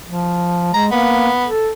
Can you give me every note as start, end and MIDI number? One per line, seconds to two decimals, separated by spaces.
0.05 0.71 53
0.74 0.91 56
0.74 0.86 82
0.92 1.29 58
0.92 1.47 59
1.46 1.70 69